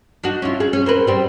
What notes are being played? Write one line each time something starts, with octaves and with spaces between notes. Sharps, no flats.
D4 D#4 F#4
C#4 E4 F4
G#4
C#4
C4 A#4 B4
G3 C4